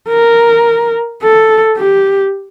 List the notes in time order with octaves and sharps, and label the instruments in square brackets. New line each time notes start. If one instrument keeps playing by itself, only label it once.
[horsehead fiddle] A#4
A4
G4